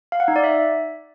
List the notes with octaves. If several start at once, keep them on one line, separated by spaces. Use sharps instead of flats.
F5
F#5
D#4
D5
E5